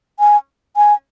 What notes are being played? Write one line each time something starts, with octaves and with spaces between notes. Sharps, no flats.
G#5
G#5